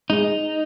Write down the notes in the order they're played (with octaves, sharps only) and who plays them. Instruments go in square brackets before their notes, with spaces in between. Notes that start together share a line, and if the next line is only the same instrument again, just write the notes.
[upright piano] G#3 [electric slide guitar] D#4